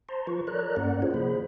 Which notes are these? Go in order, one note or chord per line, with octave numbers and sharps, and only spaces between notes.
C5 A5 A#5 C6
F3 F4 B4 C#6
A4 A#4 C#5 D5 A#5 F#6
G2 A#3 C#4 D5 F#5
C#4 E4 F4 G#4 C5 C#5
C3 F3 A#3 G#4 C5 B5